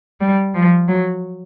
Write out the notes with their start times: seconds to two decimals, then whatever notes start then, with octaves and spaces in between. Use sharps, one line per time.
0.21 G3
0.54 F3
0.88 F#3